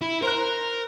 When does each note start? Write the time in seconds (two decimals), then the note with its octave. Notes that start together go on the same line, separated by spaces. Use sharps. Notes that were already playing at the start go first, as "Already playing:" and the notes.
0.01 E4
0.23 A#4 C5 A#5 F#6